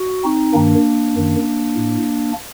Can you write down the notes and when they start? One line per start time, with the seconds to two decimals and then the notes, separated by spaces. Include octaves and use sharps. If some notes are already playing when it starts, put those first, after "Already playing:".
Already playing: F#4
0.24 C4 D#4
0.54 G2 D#3 A#3 D4
1.15 F#2 D#3
1.76 A2